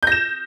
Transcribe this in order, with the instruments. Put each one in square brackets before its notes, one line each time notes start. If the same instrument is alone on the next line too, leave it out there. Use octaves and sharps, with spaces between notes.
[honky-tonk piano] G6
A#6
E7